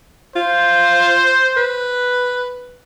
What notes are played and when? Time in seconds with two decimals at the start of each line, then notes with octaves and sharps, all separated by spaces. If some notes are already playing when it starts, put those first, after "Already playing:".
0.36 F4 C5
1.57 B4